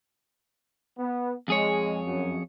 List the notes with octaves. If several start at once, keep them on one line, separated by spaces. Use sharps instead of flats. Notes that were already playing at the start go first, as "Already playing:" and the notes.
B3
F2 G#3 G#4 C#5
F#2